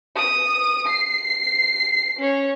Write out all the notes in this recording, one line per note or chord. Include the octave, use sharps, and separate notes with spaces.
D#6 D#7
C7
C#4 C#5